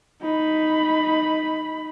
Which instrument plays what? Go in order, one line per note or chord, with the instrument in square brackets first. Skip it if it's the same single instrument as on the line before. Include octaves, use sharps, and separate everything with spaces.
[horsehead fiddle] D#4 B5